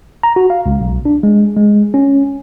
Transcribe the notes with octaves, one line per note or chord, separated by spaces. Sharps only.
A#5
F#4
F5
C#2
B1
D4
G#3
G#3
C#4